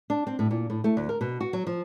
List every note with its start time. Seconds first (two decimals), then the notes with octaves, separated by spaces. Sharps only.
0.10 D4
0.27 C4
0.39 A2
0.51 A#2
0.70 A2
0.84 A3
0.97 D2
1.09 A#4
1.21 B2
1.40 F#4
1.53 F#3
1.67 F3